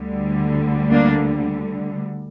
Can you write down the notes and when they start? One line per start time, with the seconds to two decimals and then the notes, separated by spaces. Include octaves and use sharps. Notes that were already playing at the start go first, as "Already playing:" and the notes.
Already playing: D2 D3 G3
0.91 A#3 D4